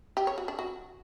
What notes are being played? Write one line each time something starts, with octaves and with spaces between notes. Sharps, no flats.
G4
C#5
F#4
D4
F#4